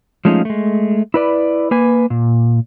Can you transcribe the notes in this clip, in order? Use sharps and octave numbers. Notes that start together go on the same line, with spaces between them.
F3 G#3 A3 C#4 D#4 F4
G#3 A3
E4 B4 D5
A#3 B4 G#5
A#2